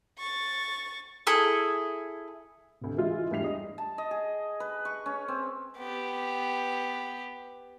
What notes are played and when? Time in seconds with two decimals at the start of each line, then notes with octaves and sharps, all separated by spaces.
0.19 C#6 A6
1.27 E4 G#4 A4
2.81 D2 C3
2.97 E3 G#3 E4 F4
3.31 E2 G2 G3 E5 C7 F7
3.44 D#5
3.78 A5
3.98 D#5
4.11 G#4
4.60 B4
4.85 C#6
5.06 C#4
5.28 C4
5.78 B3 G4